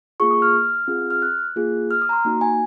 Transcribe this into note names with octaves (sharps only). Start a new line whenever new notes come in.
A#3 F4 G#4 C#6
D#6
F6
C4 F4 G#4
F6
F#6
A#3 F4 G#4
F6
D#6
A#5
C6
A#3 D#4 F#4
G#5